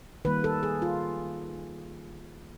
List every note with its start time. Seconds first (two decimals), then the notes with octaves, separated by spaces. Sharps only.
0.25 D#3 G3 A#3 B4
0.44 A4
0.63 G#4
0.82 F4